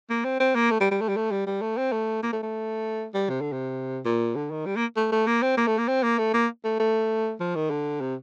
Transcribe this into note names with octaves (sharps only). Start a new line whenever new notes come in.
A#3
C4
C4
A#3
A3
G3
G3
A3
G3
A3
G3
G3
A3
C4
A3
A#3
A3
A3
G3
C3
D3
C3
A#2
D3
D#3
G3
A#3
A3
A3
A#3
C4
A#3
A3
A#3
C4
A#3
A3
A#3
A3
A3
F3
D#3
D3
C3